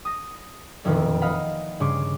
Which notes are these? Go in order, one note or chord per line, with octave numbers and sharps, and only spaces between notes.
D#6 A#6
E1 F2 A#2 D#3 E3 E4
D#5 F5 F#5 B5
G2 C#3 C#4 C6 D6